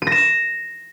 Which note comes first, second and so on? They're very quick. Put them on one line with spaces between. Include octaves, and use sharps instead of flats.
D#7 A#6 E7